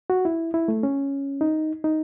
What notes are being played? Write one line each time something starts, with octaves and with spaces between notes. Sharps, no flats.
F#4
E4
E4
A3
C#4
D#4
D#4